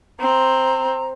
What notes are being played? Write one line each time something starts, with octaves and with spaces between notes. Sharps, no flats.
C4 A#5